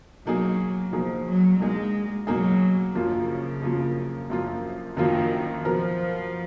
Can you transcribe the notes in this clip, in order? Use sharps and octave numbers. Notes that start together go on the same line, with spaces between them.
B2 F#3 A#3 D#4 G#4
B2 F3 A#3 D#4 G#4
F#3
B2 G#3 A#3 D#4 G#4
B2 F#3 A#3 D#4 G#4
F#2 C#3 F3 A#3 F4
F#2 F3 A#3 F4
F#2 F3 A#3 F4
F#2 D#3 F3 A#3 F4
B2 F3 F#3 B3 F4 A#4